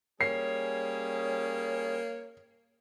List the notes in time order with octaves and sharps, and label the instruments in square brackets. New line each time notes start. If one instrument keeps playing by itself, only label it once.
[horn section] G3 C#4 G#4 [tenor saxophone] A#3 [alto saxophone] C#5 [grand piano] C7